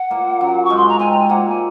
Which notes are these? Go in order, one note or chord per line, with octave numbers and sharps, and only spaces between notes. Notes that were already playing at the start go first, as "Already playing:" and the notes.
Already playing: F#5
A#2 A#3
F#2 F#3
C#6
G#2 G#3
C6
A#5
C3 C4 G#5
A#5
G#5
A#2 A#3 F#5
G#5